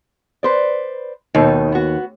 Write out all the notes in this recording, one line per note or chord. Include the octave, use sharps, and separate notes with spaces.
B4 C5 D5
D#2 B2 D#3 D#4
B3 F#4